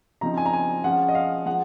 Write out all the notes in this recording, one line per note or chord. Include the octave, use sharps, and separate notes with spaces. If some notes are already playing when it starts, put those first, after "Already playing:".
C#3 F3 C4 D#4 A#5
G#5
A#5
G#5
F3 G#3 C#4 F4 F#5
D#5
F5
F3 G#3 F#5